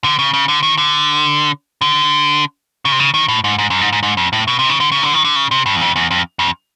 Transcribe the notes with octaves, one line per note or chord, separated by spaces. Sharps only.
D3
C#3
C#3
D3
D#3
D3
D3
C#3
C3
C#3
D#3
A2
G#2
G#2
F#2
G#2
G#2
G#2
F2
A2
B2
C3
C#3
D3
C#3
D3
D#3
D3
C#3
C3
G2
E2
F2
E2
F2
F2